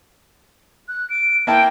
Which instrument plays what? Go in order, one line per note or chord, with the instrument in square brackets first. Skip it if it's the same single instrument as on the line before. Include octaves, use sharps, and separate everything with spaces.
[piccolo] F#6
D7
[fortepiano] A#3 E4 A5 [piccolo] G5